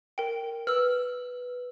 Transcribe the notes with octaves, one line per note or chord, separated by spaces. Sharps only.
A#4 G5
B4 E6 F6